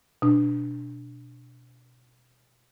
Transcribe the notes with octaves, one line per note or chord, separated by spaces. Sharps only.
B2 D4